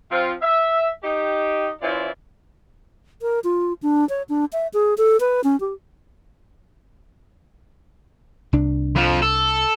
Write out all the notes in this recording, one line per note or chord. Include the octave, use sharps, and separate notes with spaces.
F3 C4 F4
E5
D#4 G4
E3 C#4 E4 F4 C5 D5
A#4
F4
D4
C#5
D4
E5
G#4
A4
B4
C#4
G4
C2 D4
F2 F3
A4